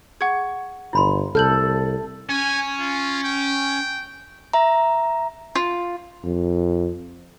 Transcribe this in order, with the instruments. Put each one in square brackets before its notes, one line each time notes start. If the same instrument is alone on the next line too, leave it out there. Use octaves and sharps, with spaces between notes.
[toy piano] G#4 [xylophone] F#5 C#6 G#6
[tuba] G1 [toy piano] E4 B5 C6
[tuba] C2 [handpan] A4 [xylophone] F6 G6 F#7
[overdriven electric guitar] C#4 [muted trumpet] G#5
[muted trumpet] F4
G5
[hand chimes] E5 A#5
[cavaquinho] F4
[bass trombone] F2